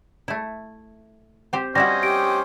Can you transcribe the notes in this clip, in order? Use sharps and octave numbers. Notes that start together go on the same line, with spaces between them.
A3 E4
C4 G4 C5
G3 C#4 E4 F#4 C5 D#5 A#6
G4 D7